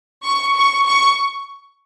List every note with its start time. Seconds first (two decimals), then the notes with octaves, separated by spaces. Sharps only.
0.24 C#6
0.55 C#6
0.86 C#6